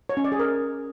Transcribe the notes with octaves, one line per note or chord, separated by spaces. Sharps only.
C#5
C#4
D5
G#4
A#4